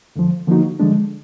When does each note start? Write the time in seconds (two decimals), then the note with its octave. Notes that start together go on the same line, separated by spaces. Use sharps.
0.16 F2 D3 F3
0.47 D3 F3 A#3 D#4 F#4
0.80 D3 F3 G#3 D4